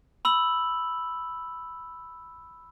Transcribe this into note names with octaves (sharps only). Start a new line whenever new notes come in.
B5 E6 F#7